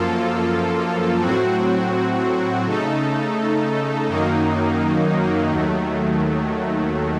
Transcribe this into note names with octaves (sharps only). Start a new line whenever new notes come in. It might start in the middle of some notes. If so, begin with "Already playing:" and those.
Already playing: F#2 F3 A#3 F4 A4
A2 F#3 C4 F#4
C#3 A3 D#4 A4
F#2 D#3 F#3 A#3 D#4
D#2 D#3 F#3 A3